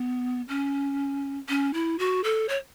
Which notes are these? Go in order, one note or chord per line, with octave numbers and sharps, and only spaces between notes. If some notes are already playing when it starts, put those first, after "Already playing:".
Already playing: B3
C#4
C#4
E4
F#4
A4
C#5